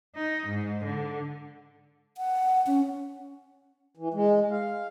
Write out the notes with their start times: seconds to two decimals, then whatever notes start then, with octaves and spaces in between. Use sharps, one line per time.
0.15 D#4
0.47 G#2
0.84 D3
2.17 F#5
2.67 C#4
3.97 E3
4.14 G#3
4.51 F5